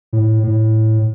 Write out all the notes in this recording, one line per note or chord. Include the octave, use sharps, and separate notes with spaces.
A2
A2